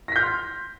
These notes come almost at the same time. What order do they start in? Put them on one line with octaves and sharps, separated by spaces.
A#6 B6 G6 F6 C6